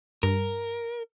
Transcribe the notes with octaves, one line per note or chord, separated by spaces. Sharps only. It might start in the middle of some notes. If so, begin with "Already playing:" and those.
G2 A#4